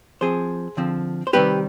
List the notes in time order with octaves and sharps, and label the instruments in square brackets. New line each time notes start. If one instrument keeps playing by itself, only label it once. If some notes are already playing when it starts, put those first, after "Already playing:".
[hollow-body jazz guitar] F3 C4 G#4 C5
D3 F3 C4
C5
C3 D#3 G3 C4 G4 B4